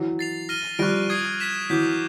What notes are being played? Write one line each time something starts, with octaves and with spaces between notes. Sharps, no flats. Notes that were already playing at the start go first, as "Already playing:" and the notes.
Already playing: E3 F#3
A6 C7 F7
F6 A#6 D#7 G7
F3 G3 C#6 F#6 A#6 D7
D#6 G#6 C7
G#6 B6 E7
E3 F#3 D6 G6 B6